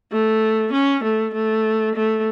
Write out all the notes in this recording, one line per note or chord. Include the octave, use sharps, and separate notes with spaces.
A3
C#4
A3
A3
A3